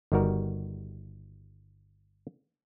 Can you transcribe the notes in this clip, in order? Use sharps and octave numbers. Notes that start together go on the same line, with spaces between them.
G1 D#3 G3 F#4 A#4